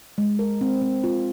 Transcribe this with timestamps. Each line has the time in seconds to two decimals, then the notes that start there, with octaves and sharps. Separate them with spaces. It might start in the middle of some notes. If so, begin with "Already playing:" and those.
0.18 G#3
0.39 A#4
0.61 C4
0.82 C4
1.04 F4